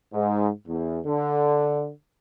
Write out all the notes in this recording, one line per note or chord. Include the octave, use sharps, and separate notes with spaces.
G#2
E2
D3